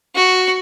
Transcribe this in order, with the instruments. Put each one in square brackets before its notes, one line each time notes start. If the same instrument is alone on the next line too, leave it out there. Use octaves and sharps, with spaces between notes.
[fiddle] F#4